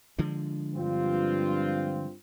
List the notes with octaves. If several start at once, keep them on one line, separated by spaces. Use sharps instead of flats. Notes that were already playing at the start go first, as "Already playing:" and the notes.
D3 F3 G#3
G2 C4 F4